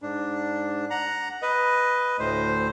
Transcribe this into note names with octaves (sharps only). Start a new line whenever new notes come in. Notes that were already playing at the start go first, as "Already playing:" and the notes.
G#2 D4
F#5 A#5
B4 D#5
D2 A2 C5